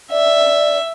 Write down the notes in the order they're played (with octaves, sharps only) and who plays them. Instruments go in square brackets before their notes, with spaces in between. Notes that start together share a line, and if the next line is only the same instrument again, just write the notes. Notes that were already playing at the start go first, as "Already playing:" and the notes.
[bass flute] D5 [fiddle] E5